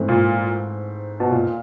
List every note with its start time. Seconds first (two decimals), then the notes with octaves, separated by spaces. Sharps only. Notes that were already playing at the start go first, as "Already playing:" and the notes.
Already playing: G#2 E3 A3 C4
0.08 A#2
1.20 B2
1.31 A#2